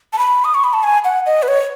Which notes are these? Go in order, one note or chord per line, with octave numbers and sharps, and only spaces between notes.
A5
B5
D#6
C#6
B5
A5
G#5
F#5
D#5
B4
C#5